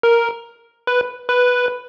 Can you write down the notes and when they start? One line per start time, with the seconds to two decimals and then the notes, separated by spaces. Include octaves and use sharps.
0.03 A#4
0.87 B4
1.29 B4